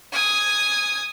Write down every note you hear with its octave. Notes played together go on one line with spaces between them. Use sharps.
G#5 D#6